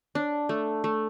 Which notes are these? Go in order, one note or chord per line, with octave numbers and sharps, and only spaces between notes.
D4
A3
A3